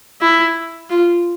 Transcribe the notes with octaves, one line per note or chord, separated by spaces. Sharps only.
E4
F4